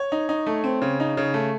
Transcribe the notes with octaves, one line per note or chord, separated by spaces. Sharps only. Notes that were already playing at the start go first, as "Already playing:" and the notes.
Already playing: C#5
D#4
D#4
A3
C4
C#3
D#4
C#3
A3